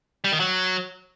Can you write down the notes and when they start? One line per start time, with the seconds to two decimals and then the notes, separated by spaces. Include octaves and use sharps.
0.24 G3
0.32 D#3
0.40 F#3